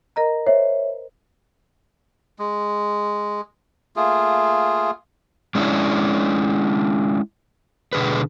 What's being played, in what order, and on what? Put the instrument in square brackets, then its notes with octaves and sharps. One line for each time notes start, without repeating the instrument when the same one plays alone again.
[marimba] A#4 D#5 A#5
[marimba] C5 [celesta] C#5 E5
[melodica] G#3
A3 A#3 F4 G#4
[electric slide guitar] G#3 C#4 D4 E4
B2 D3 G#4 B4